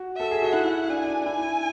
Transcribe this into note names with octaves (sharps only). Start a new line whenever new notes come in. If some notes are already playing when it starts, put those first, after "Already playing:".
Already playing: F#4
A4 E5
G#4
F#4
E4 F#5
D4 G#5
D4
E4 G#5